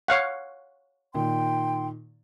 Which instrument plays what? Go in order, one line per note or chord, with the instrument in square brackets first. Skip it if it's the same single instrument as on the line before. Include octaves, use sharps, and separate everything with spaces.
[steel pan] C#5 F5 F#5
[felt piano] A#2 D#3 [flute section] G5 C6